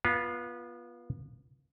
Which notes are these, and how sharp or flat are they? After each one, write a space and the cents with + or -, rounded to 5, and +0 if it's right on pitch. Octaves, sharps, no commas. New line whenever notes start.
B3 -25 F4 +0